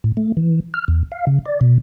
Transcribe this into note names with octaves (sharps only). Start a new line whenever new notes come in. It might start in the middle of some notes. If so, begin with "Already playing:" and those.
A2
A3
E3
F6
E2
F5
C#3
D5
B2